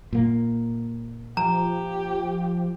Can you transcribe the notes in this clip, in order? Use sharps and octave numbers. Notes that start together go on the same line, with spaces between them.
A#2 A#3
F3 G4 A#5